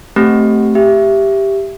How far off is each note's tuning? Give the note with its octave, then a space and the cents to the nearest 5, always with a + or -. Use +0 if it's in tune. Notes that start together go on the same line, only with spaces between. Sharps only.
A3 +0 C4 +5 G4 -15
G4 +0 E5 +15